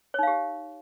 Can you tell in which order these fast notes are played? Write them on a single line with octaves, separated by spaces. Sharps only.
C#5 D#4 F5 G4